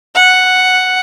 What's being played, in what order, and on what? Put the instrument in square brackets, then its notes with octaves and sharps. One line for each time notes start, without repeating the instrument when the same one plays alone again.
[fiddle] F#5